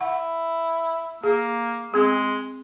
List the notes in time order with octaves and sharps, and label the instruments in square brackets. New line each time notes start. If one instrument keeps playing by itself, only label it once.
[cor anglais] E4 [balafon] F#5
[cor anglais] A#3 [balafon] G#4
[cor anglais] G#3 [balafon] C4 G#4